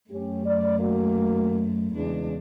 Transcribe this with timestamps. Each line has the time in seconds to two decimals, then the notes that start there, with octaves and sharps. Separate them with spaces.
0.10 F#2 A3 C#4 G4
0.45 D5
0.80 D#3 A#3 F#4
1.95 E2 C#3 E3 G#3 D4